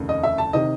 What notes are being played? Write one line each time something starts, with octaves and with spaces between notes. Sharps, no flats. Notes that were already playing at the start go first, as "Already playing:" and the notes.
Already playing: F1 D#2 C#3
D#5
E5
A5
C3 D#3 D#5